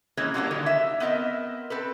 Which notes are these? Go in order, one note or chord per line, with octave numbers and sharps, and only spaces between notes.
E3 G#3 A#3 C4 C#4
F#3 G3 A#3 B3 D4 F4
D3 D#3 F#3
E5
B3 C4 A#4 D#5 E5
C4 A4 B4